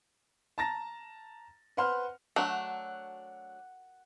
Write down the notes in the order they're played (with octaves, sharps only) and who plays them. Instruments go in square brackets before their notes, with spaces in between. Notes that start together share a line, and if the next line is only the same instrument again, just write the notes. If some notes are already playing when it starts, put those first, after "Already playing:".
[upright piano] A5 A#5 A6 A#6
B4 C5 F#5 C6 F6
[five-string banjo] F#3 A3 D4 [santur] F#5